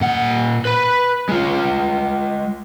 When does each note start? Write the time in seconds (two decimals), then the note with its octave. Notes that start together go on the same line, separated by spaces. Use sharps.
0.01 A#2 F#5
0.65 B4 B5
1.29 G#3 F4